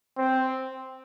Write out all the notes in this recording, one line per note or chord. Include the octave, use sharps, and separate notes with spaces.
C4